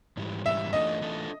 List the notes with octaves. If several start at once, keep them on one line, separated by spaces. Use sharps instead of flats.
G#2 E3 G3
G#2 E3 G3 E5
E3 A3 D4 F4 A4 D#5
E3 A3 D4 F4 A4